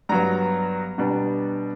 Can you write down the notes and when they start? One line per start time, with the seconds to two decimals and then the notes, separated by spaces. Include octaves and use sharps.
0.09 G2 F#3 B3 A#5
0.98 B2 G3 B3 D4